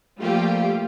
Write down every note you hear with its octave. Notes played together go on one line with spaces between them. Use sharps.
F3 G3 A3 A#3 F4 G4